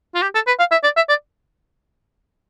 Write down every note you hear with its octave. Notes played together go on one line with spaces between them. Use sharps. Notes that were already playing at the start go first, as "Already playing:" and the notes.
F4
G4
A4
B4
F5
E5
D5
E5
D5